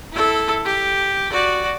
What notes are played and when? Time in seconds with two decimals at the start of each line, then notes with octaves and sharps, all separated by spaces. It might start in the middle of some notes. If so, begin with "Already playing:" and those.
0.12 E4 A4
0.65 G4
1.31 F#4 D5